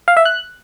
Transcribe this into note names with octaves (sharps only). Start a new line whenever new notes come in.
F5
E5
F#6